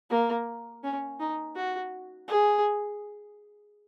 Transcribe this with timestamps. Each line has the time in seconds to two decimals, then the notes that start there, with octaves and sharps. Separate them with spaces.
0.10 A#3
0.84 C#4
1.20 D#4
1.56 F#4
2.28 G#4